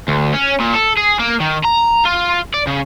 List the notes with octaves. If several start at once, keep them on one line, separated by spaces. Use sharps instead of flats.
D2
C#4
A#2
A4
G#4
A#3
D#3
A#5
F4
D5
C#3